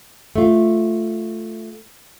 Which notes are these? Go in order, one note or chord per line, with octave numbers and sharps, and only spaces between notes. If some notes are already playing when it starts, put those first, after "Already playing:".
A3 F4